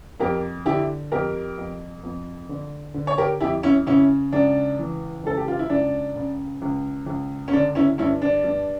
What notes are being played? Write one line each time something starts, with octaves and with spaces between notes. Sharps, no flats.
F2 G4 A#4
D3 E4 G4
F2 G4 A#4
F2
F2
D3
D3
C#5
G4 A#4
F2 E4 G4
C#4 E4
C#3 C#4 E4
C#2 D4
E3
C#2 A4
G4
F4
E4
C#2 D4
C#3
C#2
C#2
C#4
D3 D4
C#4 E4
G2 C#4 E4
D4
G2